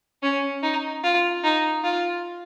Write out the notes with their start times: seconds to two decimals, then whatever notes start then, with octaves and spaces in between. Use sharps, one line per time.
0.23 C#4
0.63 D#4
1.04 F4
1.43 D#4
1.84 F4